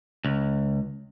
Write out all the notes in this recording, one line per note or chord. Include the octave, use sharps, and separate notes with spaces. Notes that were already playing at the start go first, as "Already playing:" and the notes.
C#2